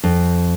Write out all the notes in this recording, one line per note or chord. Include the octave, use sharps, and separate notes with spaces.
F2